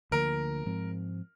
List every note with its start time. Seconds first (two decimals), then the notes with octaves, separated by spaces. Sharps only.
0.11 D2 D3 F3 A#3 A#4
0.66 G#2 F3 G#3 C4